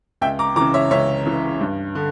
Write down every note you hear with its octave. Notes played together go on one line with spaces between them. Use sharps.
C#2 E5 G5
A#5 D6
C#3 E3 A#5 D6
C#5 E5
C#2 C#5 E5
C#3 E3
G2
D3